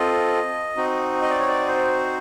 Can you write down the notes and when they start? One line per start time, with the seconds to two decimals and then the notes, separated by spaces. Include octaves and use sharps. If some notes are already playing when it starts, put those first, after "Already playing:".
Already playing: C4 F4 A4 D#5
0.77 C4 D#4 F#4
1.22 D#5
1.30 D5
1.39 C#5
1.48 D5
1.67 C5